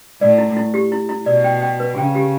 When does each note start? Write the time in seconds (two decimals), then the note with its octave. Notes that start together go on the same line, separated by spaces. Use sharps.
0.21 A2 D5
0.38 E4
0.57 E4
0.74 G4
0.92 E4
1.09 E4
1.26 B2 D5
1.44 G5
1.61 G5
1.80 B4
1.97 C#3 G5
2.15 G4